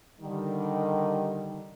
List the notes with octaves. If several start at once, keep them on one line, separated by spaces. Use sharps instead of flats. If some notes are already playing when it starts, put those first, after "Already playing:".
D3 D#3 G3